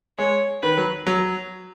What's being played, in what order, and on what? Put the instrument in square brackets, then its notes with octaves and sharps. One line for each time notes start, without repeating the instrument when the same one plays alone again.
[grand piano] G#3 [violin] C#5
[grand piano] D#3 [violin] B4
[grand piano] F#3
F#3